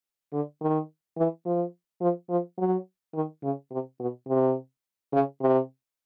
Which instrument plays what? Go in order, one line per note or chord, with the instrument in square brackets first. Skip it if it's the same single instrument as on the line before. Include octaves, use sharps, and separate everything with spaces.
[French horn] D3
D#3
E3
F3
F3
F3
F#3
D#3
C#3
C3
B2
C3
C#3
C3